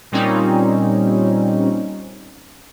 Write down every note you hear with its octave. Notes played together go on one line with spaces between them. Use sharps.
A#2 G3 C4 C#4 D#4